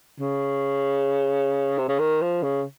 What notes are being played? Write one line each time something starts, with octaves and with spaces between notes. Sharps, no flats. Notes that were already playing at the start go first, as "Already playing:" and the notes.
C#3
C3
C#3
D#3
F3
C#3